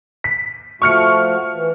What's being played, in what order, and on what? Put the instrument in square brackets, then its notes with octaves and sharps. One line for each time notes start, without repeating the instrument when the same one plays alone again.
[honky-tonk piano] B6
[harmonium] F3 A3 F#4 [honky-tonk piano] C#6 F6 C#7
[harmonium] E3